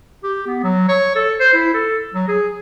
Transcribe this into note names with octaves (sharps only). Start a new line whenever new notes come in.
G4
B3
F#3
C#5
A4
C5
E4
A4
F#3
G#4